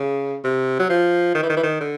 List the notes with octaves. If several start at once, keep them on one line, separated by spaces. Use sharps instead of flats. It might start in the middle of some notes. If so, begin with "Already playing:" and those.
Already playing: C#3
C3
F#3
F3
D#3
E3
D#3
E3
D#3
D3